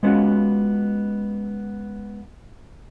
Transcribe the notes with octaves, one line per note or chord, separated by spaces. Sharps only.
G#3 B3 C#4 F4 F#4